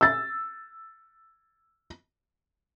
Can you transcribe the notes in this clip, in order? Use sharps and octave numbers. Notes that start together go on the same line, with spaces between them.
E6 A6